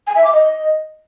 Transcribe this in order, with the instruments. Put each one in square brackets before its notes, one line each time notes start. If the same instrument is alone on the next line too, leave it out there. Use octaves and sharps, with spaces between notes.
[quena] G#5
E5
D6
D#5